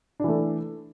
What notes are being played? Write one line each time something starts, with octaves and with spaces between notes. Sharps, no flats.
E3 A3 D4